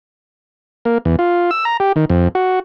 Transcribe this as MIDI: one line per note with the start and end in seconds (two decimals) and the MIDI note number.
0.85 0.98 58
1.05 1.16 40
1.19 1.51 65
1.51 1.65 88
1.65 1.77 82
1.80 1.92 67
1.96 2.05 51
2.10 2.28 41
2.35 2.60 66